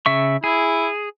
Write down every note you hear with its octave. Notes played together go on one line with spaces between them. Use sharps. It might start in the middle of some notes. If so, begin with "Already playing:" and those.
C#3 E5 C#6
E4 G#4